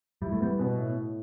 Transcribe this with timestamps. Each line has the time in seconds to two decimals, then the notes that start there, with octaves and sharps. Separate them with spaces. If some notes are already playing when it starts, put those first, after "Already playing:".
0.22 G3 E4
0.32 A3
0.40 G3 B3
0.59 B2
0.77 A2
0.96 A2